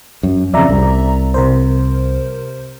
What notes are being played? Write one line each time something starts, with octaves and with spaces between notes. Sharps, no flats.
F#2
F2 C#3 D5 E5 A#5
C2
C3 A#4 C5